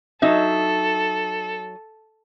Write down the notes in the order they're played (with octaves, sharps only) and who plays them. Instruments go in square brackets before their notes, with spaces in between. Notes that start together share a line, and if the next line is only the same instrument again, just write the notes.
[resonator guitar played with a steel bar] F#3 D#4 E5 [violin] A4